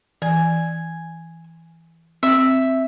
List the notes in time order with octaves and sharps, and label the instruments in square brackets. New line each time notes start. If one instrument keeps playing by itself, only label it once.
[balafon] E3 [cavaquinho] G#5
[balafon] C4 [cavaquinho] E5